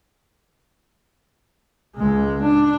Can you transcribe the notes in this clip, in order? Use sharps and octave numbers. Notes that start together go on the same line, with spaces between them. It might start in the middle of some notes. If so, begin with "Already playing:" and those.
C#2 G#3
D4